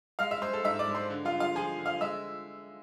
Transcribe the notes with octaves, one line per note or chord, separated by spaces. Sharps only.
G#3 F5 F6
E5 E6
G#3 C5 C6
A4 A5
G#2 E5 E6
D5 D6
G#3
C5 C6
D3
F4 F5
D3
F4 F5
F3 G#4 G#5
D3
F5 F6
G#3 E5 E6